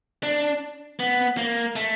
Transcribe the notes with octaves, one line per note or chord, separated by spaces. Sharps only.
D4
B3
A#3
A3